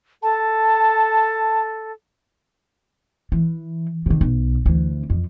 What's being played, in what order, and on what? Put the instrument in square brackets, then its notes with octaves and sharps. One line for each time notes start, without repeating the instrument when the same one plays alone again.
[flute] A4 [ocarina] A5
[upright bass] E3
C3 D#3
B1
D2 E3
F2